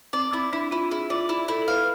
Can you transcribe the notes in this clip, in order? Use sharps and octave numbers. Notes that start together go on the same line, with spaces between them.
C4 D5
C4 E4
D4 E4
E4 F4
E4 G#4
F4 D5
E4
E4 A4
A4
B4 F5